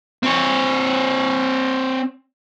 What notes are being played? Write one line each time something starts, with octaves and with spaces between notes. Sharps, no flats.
C4 C#5